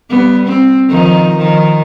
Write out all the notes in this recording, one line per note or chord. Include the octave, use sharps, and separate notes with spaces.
G3 B3
C4
D#3 F3 D#4
D#3 F3